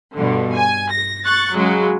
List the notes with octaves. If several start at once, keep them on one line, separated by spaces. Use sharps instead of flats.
G2 B2 D3
G#5
A#6
C#6 F#6 A6
C#3 F#3 G#3